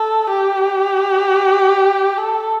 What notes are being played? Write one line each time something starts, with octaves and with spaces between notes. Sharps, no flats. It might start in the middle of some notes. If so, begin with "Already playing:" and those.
Already playing: A4
G4
A4